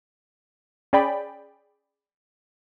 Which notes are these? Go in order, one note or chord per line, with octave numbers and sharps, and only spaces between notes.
C#4 G#4 D5 G5 B5